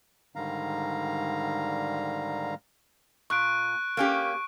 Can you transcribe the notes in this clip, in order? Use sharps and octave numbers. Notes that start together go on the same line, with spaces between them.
G#2 D3 D#3 G3 F5 A#5
A#2 C#6 F#6 D7
A#3 C#4 G4